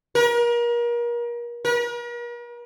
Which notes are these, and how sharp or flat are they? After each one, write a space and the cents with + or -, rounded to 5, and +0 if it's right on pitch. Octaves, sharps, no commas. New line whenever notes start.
A#4 +35
A#4 +45